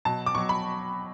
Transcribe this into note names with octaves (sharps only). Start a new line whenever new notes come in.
B2 F#3 A5
D6
B2 F#3 C#6
B5